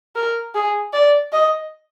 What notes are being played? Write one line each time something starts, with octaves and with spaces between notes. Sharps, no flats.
A#4
G#4
D5
D#5